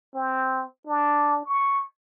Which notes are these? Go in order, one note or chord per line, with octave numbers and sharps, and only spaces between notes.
C4
D4
C#6